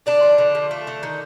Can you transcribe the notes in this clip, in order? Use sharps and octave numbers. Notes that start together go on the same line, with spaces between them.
D3 D4 D5
F3
D3
F3
A3
D3
D#3